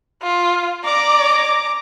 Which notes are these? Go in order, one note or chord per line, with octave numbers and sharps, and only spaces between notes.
F4
D5 A#5 D6